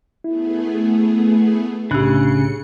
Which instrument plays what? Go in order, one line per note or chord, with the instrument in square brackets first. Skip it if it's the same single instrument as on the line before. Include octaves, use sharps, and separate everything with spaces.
[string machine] A3 B3 G#4 [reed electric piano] E4
[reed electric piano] C2 A2 F#6 [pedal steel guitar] C#3 [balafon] D4 G4 [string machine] C#7